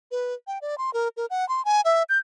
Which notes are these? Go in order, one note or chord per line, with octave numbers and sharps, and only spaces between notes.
B4
G5
D5
C6
A#4
A#4
F#5
C6
G#5
E5
G6